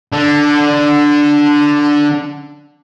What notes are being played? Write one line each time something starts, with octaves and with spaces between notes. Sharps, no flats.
D3 D4